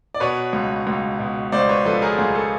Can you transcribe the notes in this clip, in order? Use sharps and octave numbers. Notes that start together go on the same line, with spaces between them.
D5
B2 B4 C#5
C#2
C#2
B2
C#2 C5 D5
B4 C#5
F3 A4 B4
G#4 A#4
C#2 G#4
A4